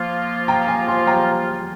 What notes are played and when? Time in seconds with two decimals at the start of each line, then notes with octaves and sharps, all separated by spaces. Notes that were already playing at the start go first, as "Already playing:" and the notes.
Already playing: F3 A#3 F4
0.48 G5 A#5
0.68 F5 G#5
0.88 G#5 C6
1.07 G5 A#5